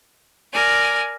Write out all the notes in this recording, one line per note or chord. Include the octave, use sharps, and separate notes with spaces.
A#4 D5 G#5